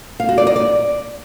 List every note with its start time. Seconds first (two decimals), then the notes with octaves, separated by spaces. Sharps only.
0.20 F5
0.29 F#4
0.38 D5
0.47 D#5
0.56 D5